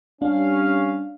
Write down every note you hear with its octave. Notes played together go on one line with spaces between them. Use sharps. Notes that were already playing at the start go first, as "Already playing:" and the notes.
G3 C#4 D4 F5